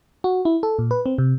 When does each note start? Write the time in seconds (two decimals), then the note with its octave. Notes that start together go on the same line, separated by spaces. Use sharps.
0.24 F#4
0.45 E4
0.63 A4
0.79 A#2
0.91 B4
1.06 C4
1.18 C3